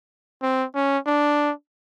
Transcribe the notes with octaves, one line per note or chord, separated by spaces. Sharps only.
C4
C#4
D4